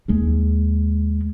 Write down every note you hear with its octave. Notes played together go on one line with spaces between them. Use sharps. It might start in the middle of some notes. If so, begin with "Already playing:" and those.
D#2 G#3